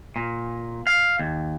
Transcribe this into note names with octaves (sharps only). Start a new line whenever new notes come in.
A#2
F5
D#2